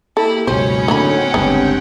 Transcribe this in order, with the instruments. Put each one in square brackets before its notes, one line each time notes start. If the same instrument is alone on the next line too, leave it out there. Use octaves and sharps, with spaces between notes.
[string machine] A#3 G4 [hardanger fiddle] E4 [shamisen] A4
[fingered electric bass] C#2 F#2 B2 [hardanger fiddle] C#4 C#5 [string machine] D#4 B5 [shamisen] C5
[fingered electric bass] A2 D3 [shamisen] F#3 A#3 B5 [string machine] C4 F#5 G5
[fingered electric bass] G1 C#2 G2 [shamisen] B3 D4